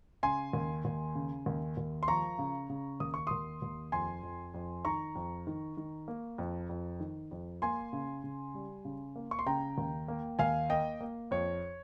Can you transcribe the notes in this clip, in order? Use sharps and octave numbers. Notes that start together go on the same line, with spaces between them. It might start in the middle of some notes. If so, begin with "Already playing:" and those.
C#3 G#5 C6
D#2
D#2
C#3
D#2
D#2
C6
F3 A#5 C#6
C#3
C#3
D#2 D#6
C#6
D#2 C6 D#6
D#2
F2 G#5 C6
F2
F2
D#3 A#5 C#6
F2
D#3
D#3
A#3
F2
F2
D#3
F2
A#3 G#5 C6
C#3
C#3
G3
C#3
A#3
C#6
C6
C#3 G5 A#5
D#2
A#3
D#2 F5 G#5
A#3 D#5 G5
A#3
F2 C#5